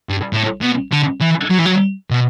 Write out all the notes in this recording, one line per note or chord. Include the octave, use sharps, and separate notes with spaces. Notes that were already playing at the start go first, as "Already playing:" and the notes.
G2
A2
B2
D3
E3
F#3
E3
F#3
B2